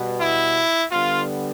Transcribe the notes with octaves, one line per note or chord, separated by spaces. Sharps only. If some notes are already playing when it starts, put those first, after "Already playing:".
Already playing: B2 G3 B3
E4
D3 G3 B3 F4